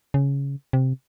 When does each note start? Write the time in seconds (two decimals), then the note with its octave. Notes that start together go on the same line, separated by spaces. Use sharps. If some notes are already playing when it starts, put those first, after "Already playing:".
0.14 C#3
0.73 C3